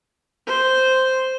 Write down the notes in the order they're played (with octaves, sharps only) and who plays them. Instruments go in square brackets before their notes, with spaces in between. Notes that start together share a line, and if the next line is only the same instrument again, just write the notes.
[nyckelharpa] C5